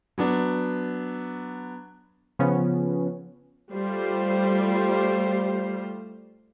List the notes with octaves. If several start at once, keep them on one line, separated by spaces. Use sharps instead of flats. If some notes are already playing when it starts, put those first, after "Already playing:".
F#3 B3 D4
C#3 F3 B3 C#4
G3 A3 F4 C5